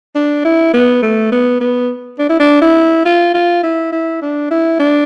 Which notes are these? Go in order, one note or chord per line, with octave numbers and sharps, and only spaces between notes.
D4
E4
B3
A3
B3
B3
D4
E4
D4
E4
F4
F4
E4
E4
D4
E4
D4